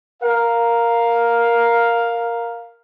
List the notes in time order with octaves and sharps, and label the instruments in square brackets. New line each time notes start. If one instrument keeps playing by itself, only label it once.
[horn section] A#4 F5